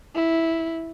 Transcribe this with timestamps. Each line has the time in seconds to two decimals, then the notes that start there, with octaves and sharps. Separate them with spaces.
0.15 E4